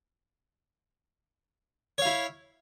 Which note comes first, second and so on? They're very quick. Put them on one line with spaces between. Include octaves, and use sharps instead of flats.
C#5 F5 E4